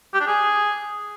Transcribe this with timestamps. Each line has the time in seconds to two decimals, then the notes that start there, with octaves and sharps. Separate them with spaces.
0.14 G4
0.21 D4
0.27 G#4